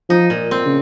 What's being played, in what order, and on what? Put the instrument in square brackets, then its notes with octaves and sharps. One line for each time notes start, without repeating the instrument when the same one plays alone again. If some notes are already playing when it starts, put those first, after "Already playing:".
[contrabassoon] F3 [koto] D#4
[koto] A#2
C4
[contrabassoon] C#3